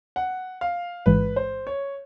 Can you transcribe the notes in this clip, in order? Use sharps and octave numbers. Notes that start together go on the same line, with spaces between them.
F#5
F5
A1 G#2 E3 G#3 B4
C5
C#5